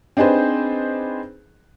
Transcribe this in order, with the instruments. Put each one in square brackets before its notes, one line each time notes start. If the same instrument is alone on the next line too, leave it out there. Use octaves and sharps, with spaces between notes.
[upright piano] C4 D4 D#4 G#4 B4 C5